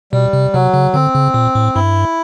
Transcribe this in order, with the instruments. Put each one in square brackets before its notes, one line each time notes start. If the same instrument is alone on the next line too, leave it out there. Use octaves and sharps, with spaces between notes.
[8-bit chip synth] B2 [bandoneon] G3
[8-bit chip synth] C3
[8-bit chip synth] C3 [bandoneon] F#3
[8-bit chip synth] C#3
[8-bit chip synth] D3 [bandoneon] C4
[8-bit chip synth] C#3
A#2
A2
[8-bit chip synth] G2 [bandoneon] E4